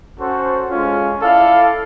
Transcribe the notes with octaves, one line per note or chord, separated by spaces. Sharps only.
C#4 F#4 A4 C5
G#3 C#4 F4
E4 A4 D5 F5